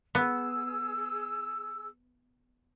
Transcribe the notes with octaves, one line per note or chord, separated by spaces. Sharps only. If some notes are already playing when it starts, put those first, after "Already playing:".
B3 G#4 E6